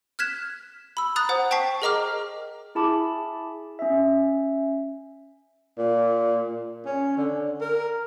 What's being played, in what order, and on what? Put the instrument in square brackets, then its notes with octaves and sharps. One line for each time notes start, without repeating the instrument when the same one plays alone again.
[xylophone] F6 F#6 G#6 B6 E7
B5 E6
A#5 D#6 F#6 A6
C5 F#5 D#6
C5 G5 A5 C#6 B6 C7
G#4 A#4 D#5 A#5 D6 F6
[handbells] E4 G#4 A5 B5 D6
C#4 E5
[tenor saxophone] A#2
C#4
D3
A#4